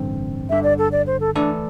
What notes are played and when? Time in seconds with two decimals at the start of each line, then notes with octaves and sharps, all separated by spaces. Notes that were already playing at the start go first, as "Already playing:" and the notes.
Already playing: A1 G2 D3 C4
0.49 G1 G2 D3 E5
0.63 D5
0.78 A4
0.92 D5
1.07 C5
1.20 A4
1.35 E3 A3 D4 E4 A4 D5